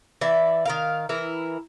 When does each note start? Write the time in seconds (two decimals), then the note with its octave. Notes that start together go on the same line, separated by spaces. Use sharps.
0.21 E3 D5 E5
0.65 D#3 A#4 F5
1.09 E3 E4 A#4